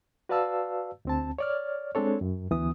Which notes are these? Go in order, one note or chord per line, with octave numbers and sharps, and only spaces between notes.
F#4 B4 D5 F5 A5 E6
D2 C4 A5
C#5 D5 F6
G#3 C4 D4 A4 C#5
F#2
D2 E3 B3 D#6